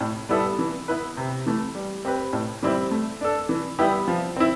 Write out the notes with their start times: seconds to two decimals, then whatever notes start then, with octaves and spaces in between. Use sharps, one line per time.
0.01 A2
0.29 G3 B3 E4 A4
0.59 E3
0.88 B3 E4 B4
1.17 C3
1.46 E3 A3
1.75 G3
2.05 C4 G4 B4
2.33 A2
2.63 E3 G3 C4 E4
2.91 A3
3.21 D4 A4
3.49 E3
3.79 G3 B3 E4 G4
4.08 F3
4.36 C4 E4